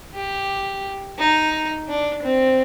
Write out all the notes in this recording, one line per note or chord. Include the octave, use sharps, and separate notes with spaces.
G4
D#4
D4
C4